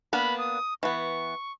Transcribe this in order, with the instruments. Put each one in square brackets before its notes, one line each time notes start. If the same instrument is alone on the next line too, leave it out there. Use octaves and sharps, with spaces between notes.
[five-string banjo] A#3 B3 D4 [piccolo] B5
[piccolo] D#6
[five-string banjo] E3 B3 [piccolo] C#6